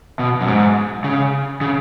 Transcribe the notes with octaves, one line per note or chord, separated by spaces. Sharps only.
B2
F#2
G#2
C#3
C#3